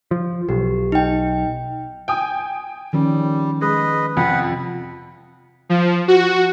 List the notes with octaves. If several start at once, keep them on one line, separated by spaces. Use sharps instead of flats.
F3
B1 G4
D#4 G5
G5 G#5 D#6
D#3 F3 G3 C#4
G#3 B4 D#5
F2 C3 F4 F#5 B5
F3
F#4